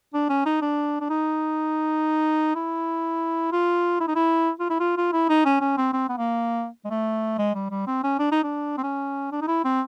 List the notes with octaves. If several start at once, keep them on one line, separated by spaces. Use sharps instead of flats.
D4
C#4
D#4
D4
D4
D#4
E4
F4
E4
D#4
E4
F4
E4
F4
F4
E4
D#4
C#4
C#4
C4
C4
B3
A#3
G#3
A3
G#3
G3
G3
C4
C#4
D4
D#4
D4
C4
C#4
D4
D#4
E4
C4